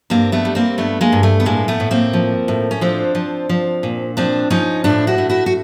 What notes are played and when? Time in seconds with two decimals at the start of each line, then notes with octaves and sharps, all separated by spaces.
0.10 G2 A#3 C4
0.32 A3 B3
0.45 G3
0.55 A#3 C4
0.78 G2 A3 B3
1.01 G#3 A#3
1.12 G2
1.23 A3
1.40 B3
1.46 A2 G#3 A#3
1.68 A3 B3
1.80 A2
1.91 A#3 C4
2.13 F3
2.48 A2
2.71 C#4
2.81 F3 C4 D4
3.15 F3
3.49 F3
3.83 A#2
4.17 F3 C4 D4
4.50 F3 C#4 D#4
4.84 A2 D4 E4
5.07 E4 F#4
5.18 A2
5.29 E4 F#4
5.46 F#4